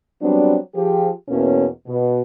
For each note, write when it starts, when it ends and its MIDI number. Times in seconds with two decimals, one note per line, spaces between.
0.22 0.56 54
0.22 0.56 55
0.22 0.56 59
0.22 0.56 60
0.22 0.56 62
0.75 1.08 53
0.75 1.08 67
0.75 1.08 68
1.29 1.67 40
1.29 1.67 47
1.29 1.67 52
1.29 1.67 58
1.29 1.67 61
1.87 2.21 47